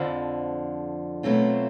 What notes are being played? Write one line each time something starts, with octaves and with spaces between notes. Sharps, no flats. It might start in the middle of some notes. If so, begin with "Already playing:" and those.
Already playing: F2 D3 F3
B2 F#3 A3 C4 F4